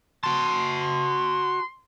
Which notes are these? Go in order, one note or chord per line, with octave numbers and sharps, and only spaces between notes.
F#4 A5 C6